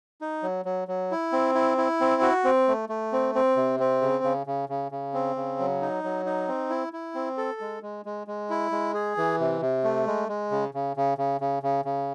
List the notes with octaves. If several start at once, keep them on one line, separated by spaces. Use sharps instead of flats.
D#4
F#3
F#3
F#3
E4
C4
E4
E4
C4
F#4
C4
A3
A3
C4
C4
C3
C4
C#3
C#3
C#3
C#3
C#3
C4
C#3
F#3
D#4
F#3
D#4
C4
E4
E4
C4
A4
G#3
G#3
G#3
G#3
E4
G#3
G#4
E3
C3
C3
A3
G#3
G#3
C#3
C#3
C#3
C#3
C#3
C#3
C#3